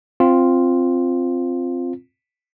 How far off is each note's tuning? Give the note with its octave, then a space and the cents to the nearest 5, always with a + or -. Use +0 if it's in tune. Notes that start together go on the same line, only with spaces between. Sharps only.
C4 +0 F4 +0